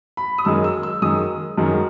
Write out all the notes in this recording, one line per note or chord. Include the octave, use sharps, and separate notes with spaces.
B5
D#6
F#2 D#3 G#3 E6
E6
E6
F#2 D#3 G#3 D#6
F#2 D#3 G#3